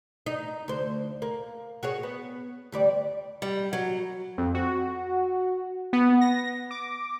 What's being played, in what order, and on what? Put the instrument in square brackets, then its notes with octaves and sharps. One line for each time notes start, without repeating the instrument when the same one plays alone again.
[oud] D#4
D2 C5
A#3
F#4 G#4 C#5
B3
D2 G3 D5
[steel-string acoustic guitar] G3
F#3
[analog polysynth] F2
F#4
B3
A#6
D6